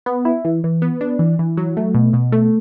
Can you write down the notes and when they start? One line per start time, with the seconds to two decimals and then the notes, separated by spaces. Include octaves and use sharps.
0.06 B3
0.25 E4
0.45 E3
0.64 E3
0.82 B3
1.01 D4
1.19 E3
1.39 E3
1.57 F#3
1.77 A3
1.95 B2
2.13 B2
2.32 A3